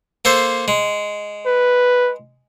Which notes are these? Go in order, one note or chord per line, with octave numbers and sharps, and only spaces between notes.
A#3 A4 C5
G#3
B4